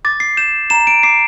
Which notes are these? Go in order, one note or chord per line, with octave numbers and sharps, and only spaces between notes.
D6 A6
C7
G6 E7
A#5 E7
D7
D6 C7